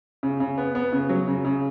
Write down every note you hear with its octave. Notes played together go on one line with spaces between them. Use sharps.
C#3
C#3
B3
B3
C#3
F#3
C#3
C#3